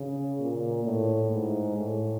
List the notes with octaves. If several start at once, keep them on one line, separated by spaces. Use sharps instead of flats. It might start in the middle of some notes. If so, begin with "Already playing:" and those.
Already playing: C#3
A#2
A2
G#2
A2